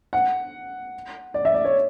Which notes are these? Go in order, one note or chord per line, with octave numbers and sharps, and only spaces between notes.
F#5
D5
E5
D5
C#5